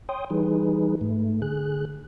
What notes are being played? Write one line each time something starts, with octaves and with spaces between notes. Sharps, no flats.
C#5 G5 C6 D#6
E3 G3 D#4 G#4 B4
G#2 A3
D3 G#4 F#6